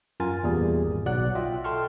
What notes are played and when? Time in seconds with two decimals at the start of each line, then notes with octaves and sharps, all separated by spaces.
0.20 F#2 F4 A#4 G#5 A6
0.43 E2 A#2 G3 G#4
0.83 G#1
1.06 B1 B2 F#3 D5 F#5 F#6
1.35 F4 D#5 E5 G5
1.64 A4 G5 A5 C6 C#6 F6